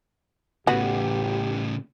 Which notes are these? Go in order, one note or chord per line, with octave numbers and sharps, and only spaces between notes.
A1 A2 C#3 B3 F#4 G4